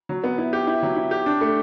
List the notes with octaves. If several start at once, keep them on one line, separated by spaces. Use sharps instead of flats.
F#3
B3
E4
G4
E4
F#3
E4
G4
D4
A3